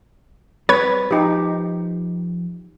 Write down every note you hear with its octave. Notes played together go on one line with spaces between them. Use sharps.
G3 C4 B4 C#5 G#6
F3 D#4 G4